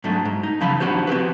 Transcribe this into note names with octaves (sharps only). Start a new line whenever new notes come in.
G#2 F#3 G#3 A3 D4
G#2
D#4
F#2 C#3 F3 F5 B5
F3 D4 F#4 G4 C5
C4 F#4 G4 B4